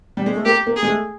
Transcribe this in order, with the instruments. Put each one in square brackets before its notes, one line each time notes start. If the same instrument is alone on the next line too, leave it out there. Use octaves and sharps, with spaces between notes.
[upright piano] G3
G#3
A3
[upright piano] A#3 [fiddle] G4
[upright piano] A#3
[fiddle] G#4
[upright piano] G#3
A3